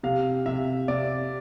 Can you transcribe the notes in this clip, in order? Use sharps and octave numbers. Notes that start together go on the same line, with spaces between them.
C3 F5
C3 E5
C3 D5